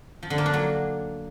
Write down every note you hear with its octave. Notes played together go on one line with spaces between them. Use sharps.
F3
D3
A#3
D4
F#3